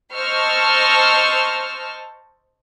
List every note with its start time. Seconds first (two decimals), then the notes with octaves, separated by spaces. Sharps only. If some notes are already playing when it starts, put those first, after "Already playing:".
0.15 C5 D#5 A5 C#6 E6 F6